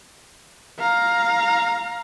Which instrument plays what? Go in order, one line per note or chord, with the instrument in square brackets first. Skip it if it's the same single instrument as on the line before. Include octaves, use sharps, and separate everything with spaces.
[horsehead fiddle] F5 A#5